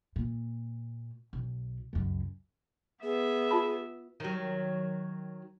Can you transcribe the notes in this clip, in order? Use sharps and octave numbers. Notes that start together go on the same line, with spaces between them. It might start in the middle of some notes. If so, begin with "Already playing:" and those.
A#2
B1
C#2 F#2
B3 G#4 E5
F4 A5 B5
D#3 F#3